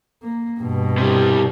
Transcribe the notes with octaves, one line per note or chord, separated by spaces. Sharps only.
A#3
G2 B2
C3 G3